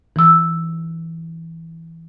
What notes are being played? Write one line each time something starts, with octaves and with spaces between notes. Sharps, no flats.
E3 E6